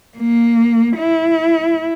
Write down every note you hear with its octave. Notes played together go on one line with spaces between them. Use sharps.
A#3
E4